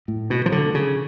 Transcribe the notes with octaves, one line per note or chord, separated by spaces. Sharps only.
A2
B2
F3
D3
C#3